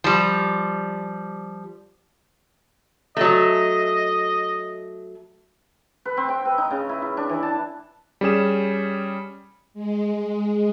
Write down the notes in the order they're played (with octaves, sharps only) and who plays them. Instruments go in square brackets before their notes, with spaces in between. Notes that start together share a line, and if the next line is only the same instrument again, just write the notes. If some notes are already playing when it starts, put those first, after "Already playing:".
[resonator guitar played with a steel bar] F3 G3
[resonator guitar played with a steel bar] F#3 A3 [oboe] D#5
[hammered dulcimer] B4
C4
G5
B4
D#4
C#3
E4
E4
D4
E3
A5
[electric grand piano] G3 C#4 G#4 E7
[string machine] G#3